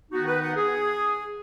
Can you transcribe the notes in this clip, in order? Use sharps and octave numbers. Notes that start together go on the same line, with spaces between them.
D#3 B3 D#4 F#4
B4
F#5
G#4